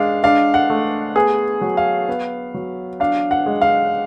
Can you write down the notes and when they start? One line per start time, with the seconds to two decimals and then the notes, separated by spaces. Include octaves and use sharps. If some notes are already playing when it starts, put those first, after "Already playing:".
Already playing: G#3 D4 F5
0.24 D4 F5
0.54 F#5
0.70 A3
1.15 B3 G#4
1.61 F#3
1.77 F5
2.08 B3
2.54 F#3
3.00 D4 F5
3.31 F#5
3.46 G#3
3.61 F5